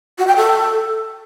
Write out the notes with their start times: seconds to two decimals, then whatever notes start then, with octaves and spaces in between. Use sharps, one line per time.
0.18 F#4
0.27 G5
0.36 A4